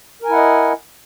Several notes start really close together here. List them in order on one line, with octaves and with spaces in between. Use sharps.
A#4 G#5 E4 F#5 D#5